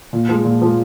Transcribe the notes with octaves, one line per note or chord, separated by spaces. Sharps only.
A#2
F3 G#3
A#2
F3 G#3